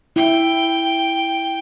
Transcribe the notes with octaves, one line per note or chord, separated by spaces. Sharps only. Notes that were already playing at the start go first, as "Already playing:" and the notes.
E4 G5